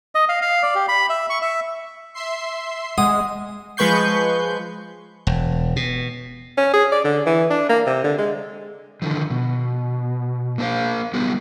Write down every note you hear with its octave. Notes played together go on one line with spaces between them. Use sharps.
D#5
F5
F5
D5
G4
B5
E5
C#6
E5
E5 C6 C7
G#3 F#5 D#6
F3 G#3 B4 C#6 G6 C7
E1
B2
C#4
G#4
D5
D3
E3
D4
A#3
C3
D3
G#3
D3 D#3 F3
B2
A#3 C4 D4 C5 F5
G3 B3 D#4 F#4 G4